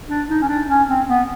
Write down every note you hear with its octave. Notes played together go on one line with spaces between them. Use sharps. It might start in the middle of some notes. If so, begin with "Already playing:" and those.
D4
D#4
C#4
D4
C#4
C4
B3